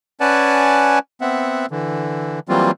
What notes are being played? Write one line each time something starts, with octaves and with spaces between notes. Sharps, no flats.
C#4 B4 D5 F#5 G#5 A5
B3 C4 E5 F#5
D3 E3
E3 F#3 G3 A#3 C4 F4